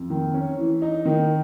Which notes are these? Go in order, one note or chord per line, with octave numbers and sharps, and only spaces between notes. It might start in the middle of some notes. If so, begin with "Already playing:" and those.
Already playing: F2
D#3
C#4
E3
D#4
D#3